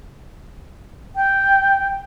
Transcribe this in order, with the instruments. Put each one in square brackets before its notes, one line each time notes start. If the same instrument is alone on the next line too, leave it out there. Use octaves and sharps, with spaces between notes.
[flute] G5